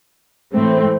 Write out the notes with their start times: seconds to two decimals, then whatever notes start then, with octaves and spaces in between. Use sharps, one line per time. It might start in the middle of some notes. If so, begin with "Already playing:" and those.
0.52 A2 E3 A3 C4